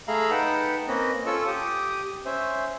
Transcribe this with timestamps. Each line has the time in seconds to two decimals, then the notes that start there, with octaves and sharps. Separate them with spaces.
0.08 A3 G#4 E5 F5 A#5 B5
0.31 D#4 B4 F#5 G5 A5
0.88 A#3 C4 C#4 B4 D#5
1.26 C#4 F4 A4 C#6 E6
1.47 G4 D#6
2.25 C#4 C5 E5